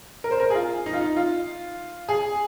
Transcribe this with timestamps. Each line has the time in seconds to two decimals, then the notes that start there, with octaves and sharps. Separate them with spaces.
0.24 A#4
0.31 C5
0.40 A#4
0.50 G#4
0.55 F4
0.86 D#4
0.93 F4
1.01 D#4
1.17 F4
2.09 G#4